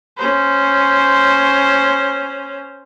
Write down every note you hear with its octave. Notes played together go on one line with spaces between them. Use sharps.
C#4 C5